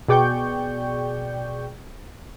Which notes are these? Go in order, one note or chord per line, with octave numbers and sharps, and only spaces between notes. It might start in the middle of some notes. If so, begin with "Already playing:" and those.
B2 G#4 D5 G5 C#6 G6